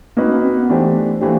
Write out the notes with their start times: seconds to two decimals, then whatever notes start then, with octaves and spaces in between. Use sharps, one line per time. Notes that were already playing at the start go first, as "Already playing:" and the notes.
0.17 A#3 C4 D#4 F#4 B4
0.30 C#4
0.42 C4
0.56 B3
0.69 E3 A3 D4 G4 C5
1.21 E3 A3 A#3 D4 G4 C5